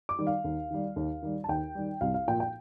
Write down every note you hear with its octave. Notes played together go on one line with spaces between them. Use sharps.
D6
D#3 G3
F5
D#2
D#3 G3
D#2
D#3 G3
A5
D#2 G5
D#3 G3
C2 F5
F5
A#2 F3 G5
G5